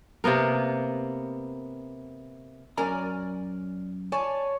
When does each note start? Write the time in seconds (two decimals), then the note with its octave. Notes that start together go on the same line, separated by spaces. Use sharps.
0.24 C3 A#3 B3 A#4
2.77 F#2 C#4 A#4 D5 G#5 A#5
4.12 C#5 D5 G#5 A5